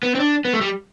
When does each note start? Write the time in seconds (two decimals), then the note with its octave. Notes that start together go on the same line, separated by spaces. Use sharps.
0.03 B3
0.15 C4
0.20 D4
0.45 B3
0.53 A3
0.61 G3